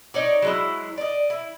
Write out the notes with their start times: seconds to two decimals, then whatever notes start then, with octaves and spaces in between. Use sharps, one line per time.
0.14 D#4 C#5 D5
0.42 F#3 G#3 E4
0.98 D5 D#5
1.30 E4